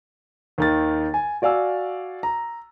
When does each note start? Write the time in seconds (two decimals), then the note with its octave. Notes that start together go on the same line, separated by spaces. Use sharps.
0.58 D#2 D#3 A6
1.14 G#5
1.42 F#4 D5 F5 G#5 E6
2.23 A#5